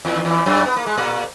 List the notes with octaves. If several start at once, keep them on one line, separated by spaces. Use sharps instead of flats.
E2 E3
D#3
E2 E3
F#2 F#3
B3
A#3
G#3
A#2 A#3